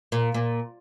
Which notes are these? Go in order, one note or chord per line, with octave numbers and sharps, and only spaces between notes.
A#2
A#2